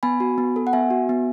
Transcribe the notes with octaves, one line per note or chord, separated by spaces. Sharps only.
B3 G#5 B5
F#4
B3
A4
F#5
B3 E5 G#5
F#4
B3